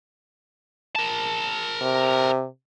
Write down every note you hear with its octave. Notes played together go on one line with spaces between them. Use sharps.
A#4 A5
C3